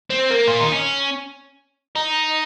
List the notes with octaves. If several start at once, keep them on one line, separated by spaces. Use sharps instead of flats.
C4
A#3
F4
D#4
C#4
D#4